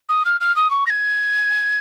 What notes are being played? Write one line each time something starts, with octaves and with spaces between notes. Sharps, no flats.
D#6
F6
F6
D#6
C#6
A#6
G#6